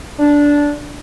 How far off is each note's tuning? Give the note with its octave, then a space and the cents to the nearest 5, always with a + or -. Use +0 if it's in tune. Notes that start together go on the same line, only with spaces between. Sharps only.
D4 -10